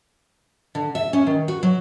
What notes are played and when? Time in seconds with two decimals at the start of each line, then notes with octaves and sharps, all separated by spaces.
0.75 D3
0.95 E5
1.13 C#4
1.27 D#3
1.48 F#4
1.63 F#3